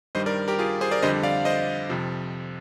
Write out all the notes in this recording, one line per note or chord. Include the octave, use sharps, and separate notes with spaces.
G2 D#3 G3 C5 D#5
A#4 D5
G4 A#4
F4 G#4
G#4 C5
A#4 D5
F2 D3 G3 C5 D#5
D5 F5
C5 D#5
F2 C3 F3